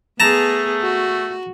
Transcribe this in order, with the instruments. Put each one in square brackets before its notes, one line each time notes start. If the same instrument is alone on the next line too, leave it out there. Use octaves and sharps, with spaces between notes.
[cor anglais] A3 [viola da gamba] B3 G#4 [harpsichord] A5 A#5
[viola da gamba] F#4